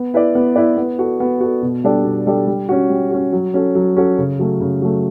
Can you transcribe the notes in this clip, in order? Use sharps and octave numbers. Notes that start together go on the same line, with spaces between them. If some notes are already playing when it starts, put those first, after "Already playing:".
Already playing: B3
E4 B4 D5
B3
E4 B4 D5
B3
F#4 A4
B3
F#4 A4
B2
G3 D4 A4 D5
B2
G3 D4 A4 D5
G3
C#4 F#4
G3
C#4 F#4
F#3
C#4 F#4 A4
F#3
C#4 F#4 A4
C#3
F#3 A3
C#3
F#3 A3